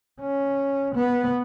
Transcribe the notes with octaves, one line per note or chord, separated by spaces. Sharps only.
C#4
B3